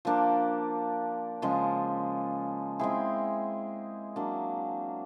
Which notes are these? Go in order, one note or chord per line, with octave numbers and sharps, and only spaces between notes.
F3 A#3 D4
C#3 F3 G#3
G#3 C4 E4 G#4
F#3 A#3 D4